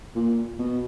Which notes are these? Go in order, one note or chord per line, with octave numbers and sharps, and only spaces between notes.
A#2
B2